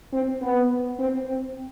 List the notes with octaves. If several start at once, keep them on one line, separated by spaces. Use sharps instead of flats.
C4
B3
C4
C4